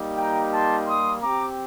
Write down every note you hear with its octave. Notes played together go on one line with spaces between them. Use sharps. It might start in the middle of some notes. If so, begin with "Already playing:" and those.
Already playing: G3 A#3 D#4 G4
G5 A#5
A5 C6
C6 D#6
C4 G4 A#5 D6